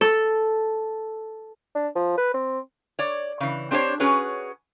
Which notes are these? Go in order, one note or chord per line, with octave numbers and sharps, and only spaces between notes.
A4
D4
F3
B4
C4
C#5 D5
C#3 E3
C4 D4 G4 C5 C#5
C#4 F#4 G#4 B4 C#5